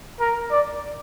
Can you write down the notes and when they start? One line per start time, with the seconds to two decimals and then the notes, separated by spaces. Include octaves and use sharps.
0.20 A#4
0.51 D5